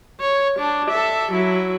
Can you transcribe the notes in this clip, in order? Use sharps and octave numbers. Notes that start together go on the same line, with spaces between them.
C#5
D4
A4 E5
F#3 E4